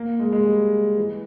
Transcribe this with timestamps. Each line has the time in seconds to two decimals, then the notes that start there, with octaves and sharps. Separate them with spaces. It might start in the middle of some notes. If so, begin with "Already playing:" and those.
Already playing: A#3
0.19 G#3
0.32 G#3
0.46 G3
0.97 E3